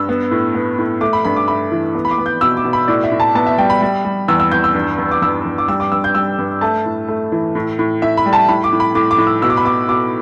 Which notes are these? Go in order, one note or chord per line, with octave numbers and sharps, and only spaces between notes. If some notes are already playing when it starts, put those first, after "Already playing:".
Already playing: G2 E6
B3
A2
B3
A2
A3 D6
B5
G2 B5
D6
A3 B5
E3
B3
B5
D6
B3
G6
B2 E6
D6
B2
B5
A2 D5
E5
A2
A5
B3 A5
E5
G3 G5
B5
G3
G3
E2 E6
E6
E2 G6
E6
G2
G2
D6
G2 E6
G2
D6
G3 E6
D6
G2 E6
G6
G3 E6
G2
A3 A5
A2
A3
E3
A2
A2
A2 E5
B5
G3
A5
A2 B5
D6
A2
B5
A2 D6
D6
A2
E6
B2 E6
D6
B5
B2 D6
B2 D6